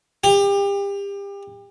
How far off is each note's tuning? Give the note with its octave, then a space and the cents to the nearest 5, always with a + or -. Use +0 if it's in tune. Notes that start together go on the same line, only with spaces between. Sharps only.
G4 +30